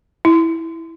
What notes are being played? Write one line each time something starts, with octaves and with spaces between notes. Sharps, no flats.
E4